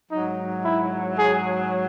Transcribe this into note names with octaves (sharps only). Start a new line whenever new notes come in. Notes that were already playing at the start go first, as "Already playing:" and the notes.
G#2 F#3 D#4
E4
G#4